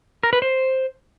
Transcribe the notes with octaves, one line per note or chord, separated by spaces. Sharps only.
A#4
B4
C5